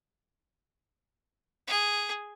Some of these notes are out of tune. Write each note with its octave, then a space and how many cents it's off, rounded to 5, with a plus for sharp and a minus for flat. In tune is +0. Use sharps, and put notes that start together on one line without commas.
G#4 -5